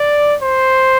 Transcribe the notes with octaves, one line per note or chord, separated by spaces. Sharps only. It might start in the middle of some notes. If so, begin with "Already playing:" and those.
Already playing: D5
C5